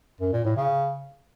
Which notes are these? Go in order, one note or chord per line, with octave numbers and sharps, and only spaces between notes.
F#2
A#2
A2
C#3